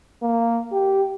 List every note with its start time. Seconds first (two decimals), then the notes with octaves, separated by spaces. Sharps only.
0.23 A#3
0.72 G4